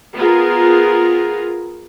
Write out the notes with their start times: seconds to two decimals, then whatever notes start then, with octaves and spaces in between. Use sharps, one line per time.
0.15 B3 F4 G#4 A#4